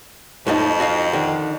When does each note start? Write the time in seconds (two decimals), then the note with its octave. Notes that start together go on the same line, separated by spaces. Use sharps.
0.47 F2 A2 F3 D#4
0.80 F#4 D#5 F5
1.13 D3 D#3